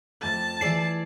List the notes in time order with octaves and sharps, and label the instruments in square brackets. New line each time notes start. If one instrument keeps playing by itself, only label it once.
[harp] F2 A3 D6 [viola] A5
[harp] E3 E6 [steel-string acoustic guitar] G#4 D5 [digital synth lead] C7